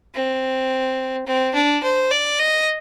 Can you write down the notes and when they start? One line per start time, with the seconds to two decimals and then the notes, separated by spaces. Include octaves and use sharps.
0.14 C4
1.27 C4
1.54 D4
1.83 C5
2.11 D5
2.40 D#5